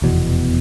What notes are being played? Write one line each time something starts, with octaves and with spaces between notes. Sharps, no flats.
F1 E2 B2